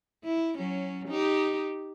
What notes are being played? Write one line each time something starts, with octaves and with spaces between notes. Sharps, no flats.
E4
F#3 C#4
D#4 G4